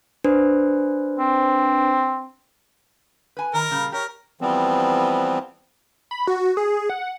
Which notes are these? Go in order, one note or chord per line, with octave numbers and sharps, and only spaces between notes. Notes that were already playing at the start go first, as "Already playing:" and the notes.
D4 B4 C5
C4
B4 G#5
D#3 A#4 A#5
A#2 C#3 G3
G4 A#4 C#5
E3 F3 G3 B3 C4
B5
F#4
G#4
G#4
F#5